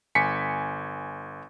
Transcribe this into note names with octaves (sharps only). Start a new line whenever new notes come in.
G1 G#5 B6 C#7